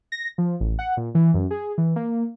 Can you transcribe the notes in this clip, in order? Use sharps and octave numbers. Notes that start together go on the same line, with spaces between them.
A#6
F3
A1
F#5
A#2
E3
F#2
G#4
E3
A#3